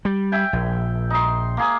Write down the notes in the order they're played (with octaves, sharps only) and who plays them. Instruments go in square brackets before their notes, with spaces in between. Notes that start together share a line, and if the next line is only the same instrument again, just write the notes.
[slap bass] G3
[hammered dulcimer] E5 G5 G#5
[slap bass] A#1
[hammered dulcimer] D#4 C6
A#3 G#4